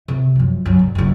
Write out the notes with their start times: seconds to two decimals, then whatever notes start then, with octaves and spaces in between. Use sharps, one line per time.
0.08 C3
0.35 F#2 F3
0.66 F#2 C#3
0.79 G2
0.95 F#1 F#2